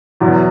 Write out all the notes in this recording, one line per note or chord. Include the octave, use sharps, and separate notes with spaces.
E2 B2 F#3 E4